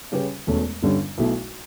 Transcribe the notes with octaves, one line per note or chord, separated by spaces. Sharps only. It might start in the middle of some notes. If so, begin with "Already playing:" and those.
C#3 G3 C#4 G4 B4
E1 E2 B2 A3 C#4
G1 G2 D3 G3 C#4
B1 B2 A3 E4